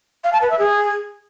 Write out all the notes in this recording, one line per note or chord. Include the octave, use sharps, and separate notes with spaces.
F5
A5
B4
E5
G#4